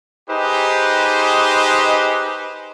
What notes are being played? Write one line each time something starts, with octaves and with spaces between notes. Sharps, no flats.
D#4 G4 G#4 B4 C5 D#5